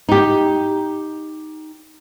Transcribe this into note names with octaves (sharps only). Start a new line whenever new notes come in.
D#4 G4